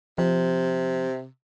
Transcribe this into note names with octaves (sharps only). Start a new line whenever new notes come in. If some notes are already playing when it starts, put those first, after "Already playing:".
C3 F3